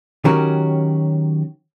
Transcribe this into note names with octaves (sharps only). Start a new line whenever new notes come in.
D#3 F#3 C#4 F#4 G4 A#4